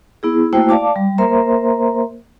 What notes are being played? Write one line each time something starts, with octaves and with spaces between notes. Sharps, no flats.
B3 E4 G#4
A3 A#3 E4 F#4 C5 G5
D5 F5 A5 D6
G3
A#3 A#4 C5 E5 A#5 C6